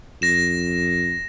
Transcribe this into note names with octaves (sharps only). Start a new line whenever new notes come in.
F2 A#6 E7